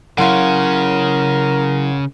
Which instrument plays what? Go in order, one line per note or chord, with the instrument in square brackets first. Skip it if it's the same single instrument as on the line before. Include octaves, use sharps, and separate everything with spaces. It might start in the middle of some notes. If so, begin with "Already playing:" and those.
[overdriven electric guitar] C#3 C#4 [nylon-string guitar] F#3 E4 F5 [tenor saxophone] A#4 [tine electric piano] F#5 C6